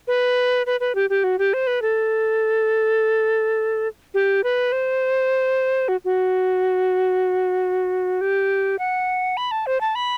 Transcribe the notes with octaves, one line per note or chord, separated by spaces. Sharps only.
B4
B4
B4
G4
G4
F#4
G4
C5
B4
A4
G4
B4
C5
F#4
F#4
G4
F#5
B5
A5
C5
A5
B5